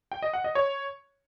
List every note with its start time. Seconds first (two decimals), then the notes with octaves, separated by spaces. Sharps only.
0.12 G5
0.23 D#5
0.33 F#5
0.44 D#5
0.55 C#5